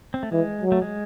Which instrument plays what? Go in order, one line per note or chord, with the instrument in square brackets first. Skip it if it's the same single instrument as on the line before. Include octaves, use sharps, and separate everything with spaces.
[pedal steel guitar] C4
A3
[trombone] E3 [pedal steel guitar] G#3
[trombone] F#3
[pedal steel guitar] A3
G#3